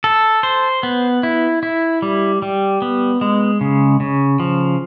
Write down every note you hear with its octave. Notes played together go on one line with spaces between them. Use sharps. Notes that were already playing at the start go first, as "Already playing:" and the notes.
A4
C5
B3
E4
E4
G3
G3
B3
G#3
C#3
C#3
F3